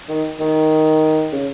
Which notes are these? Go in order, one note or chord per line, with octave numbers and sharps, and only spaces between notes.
D#3
D#3
C#3